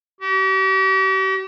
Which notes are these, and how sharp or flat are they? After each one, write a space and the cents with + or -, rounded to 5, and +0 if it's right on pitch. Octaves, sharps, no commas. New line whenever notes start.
G4 -40